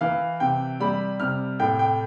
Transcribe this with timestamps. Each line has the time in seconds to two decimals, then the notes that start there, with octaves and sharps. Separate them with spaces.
0.01 E3 F5
0.40 C3 G5
0.80 G3 B5
1.20 C3 F6
1.60 A2 G5
1.79 G5